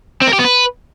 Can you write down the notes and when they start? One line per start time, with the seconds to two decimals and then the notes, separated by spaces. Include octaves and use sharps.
0.22 C4
0.27 A#4
0.33 G4
0.39 B3
0.45 B4